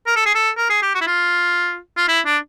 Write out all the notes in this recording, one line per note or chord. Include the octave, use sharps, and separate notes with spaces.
A#4
A4
G#4
A4
A#4
G#4
G4
F#4
E4
F4
F4
E4
D4